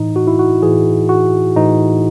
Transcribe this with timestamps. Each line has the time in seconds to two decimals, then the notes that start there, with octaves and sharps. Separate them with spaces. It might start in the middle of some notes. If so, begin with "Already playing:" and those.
Already playing: A2 E3 D#4
0.16 F#4
0.27 E4
0.39 F#4
0.63 A2 E3 G#4
1.09 F#4
1.56 A2 E3 D#4